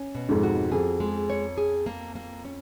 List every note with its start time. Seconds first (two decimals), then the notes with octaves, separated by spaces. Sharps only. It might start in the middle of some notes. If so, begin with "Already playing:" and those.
Already playing: C#4
0.15 B2
0.29 F2 G#2
0.43 F#4
0.72 F2 G#4
1.00 G#3
1.30 C#5
1.58 G#4
1.86 A#3
2.15 A#3
2.45 C#4